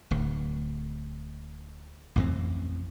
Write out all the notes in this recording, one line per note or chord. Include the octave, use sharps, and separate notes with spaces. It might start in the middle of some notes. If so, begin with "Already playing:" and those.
D1 D2
A1 F2 E3 C4